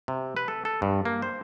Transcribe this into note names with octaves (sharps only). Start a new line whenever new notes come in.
C3
B4
A4
A4
G2
A#3
C5